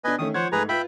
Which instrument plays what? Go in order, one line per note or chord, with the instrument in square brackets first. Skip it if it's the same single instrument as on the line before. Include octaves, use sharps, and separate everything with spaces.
[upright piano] B2 D4 [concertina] B4 D#5 G#5
[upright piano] D#3 A3 C#4 [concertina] D#6
[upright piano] F3 G#6 [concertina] C5 C#5 F#5
[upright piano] G#2 A3 [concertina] G#4 B4 A#5
[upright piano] F4 B4 [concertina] E5 G5 B5